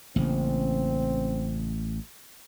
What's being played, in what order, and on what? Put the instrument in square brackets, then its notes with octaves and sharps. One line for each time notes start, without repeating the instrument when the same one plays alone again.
[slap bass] A1 [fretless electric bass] C#3 A#3 [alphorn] C4